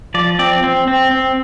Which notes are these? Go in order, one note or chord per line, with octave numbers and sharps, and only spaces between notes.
F3 D5
C4 D5
C4
C4
C4